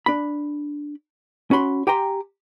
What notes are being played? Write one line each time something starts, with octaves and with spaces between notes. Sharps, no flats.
D4 B5
C#4 F#4 B5 C6
G4 G5 G#5 A#5 C6